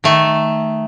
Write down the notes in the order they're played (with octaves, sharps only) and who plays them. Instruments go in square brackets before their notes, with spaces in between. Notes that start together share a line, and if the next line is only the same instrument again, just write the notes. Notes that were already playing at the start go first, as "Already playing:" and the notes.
[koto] D#3 A3